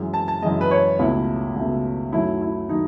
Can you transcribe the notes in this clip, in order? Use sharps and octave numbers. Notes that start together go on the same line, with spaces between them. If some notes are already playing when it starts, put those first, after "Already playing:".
Already playing: F#2 E3 G#3
A5
A5
F#2 E3 G#3 D#5
B4
C#5
C#2 B2 A3 E4
C#2 B2 A3
F#2 D#3 F#3 A3 E4
E4
D#3 F#3 A3 D#4